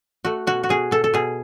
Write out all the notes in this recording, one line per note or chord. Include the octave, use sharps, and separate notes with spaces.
A3 F#4
B2 F#4
F#4
B2 G#4
B2 A4
A4
B2 G#4